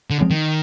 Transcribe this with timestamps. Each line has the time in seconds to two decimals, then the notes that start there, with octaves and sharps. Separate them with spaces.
0.10 D3
0.21 F3 G#3 C4
0.31 D#3